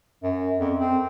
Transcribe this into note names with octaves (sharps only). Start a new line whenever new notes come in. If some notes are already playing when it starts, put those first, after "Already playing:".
F#2
F2
C4